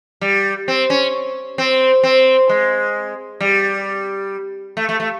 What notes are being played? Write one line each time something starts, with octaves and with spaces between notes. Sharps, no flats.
G3
C4
C#4
C4
C4
G#3
G3
A3
A3
A3